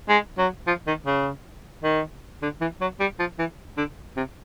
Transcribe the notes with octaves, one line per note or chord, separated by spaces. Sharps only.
G#3
F#3
F3
D#3
C#3
D#3
D3
E3
F#3
G3
F3
E3
D3
C3